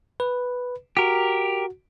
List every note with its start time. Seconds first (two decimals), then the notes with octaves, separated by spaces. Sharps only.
0.20 B4
0.97 F#4 G4 A#4